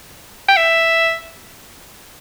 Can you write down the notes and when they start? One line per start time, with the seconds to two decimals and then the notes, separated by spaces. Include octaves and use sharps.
0.48 G5
0.57 E5